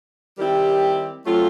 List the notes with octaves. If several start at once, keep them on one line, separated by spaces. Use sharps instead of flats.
D#3 G3 C4 E4 G4
F#3 A3 C4 F4